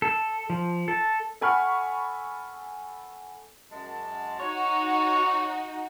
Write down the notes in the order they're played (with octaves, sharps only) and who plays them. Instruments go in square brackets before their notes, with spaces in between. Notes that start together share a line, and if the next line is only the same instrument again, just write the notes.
[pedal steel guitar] A4
F3
A4
[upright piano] A4 F#5 G#5 B5 C#6 F6
[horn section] F#2 G#3 A5
[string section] D#4 F#4 [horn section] C#5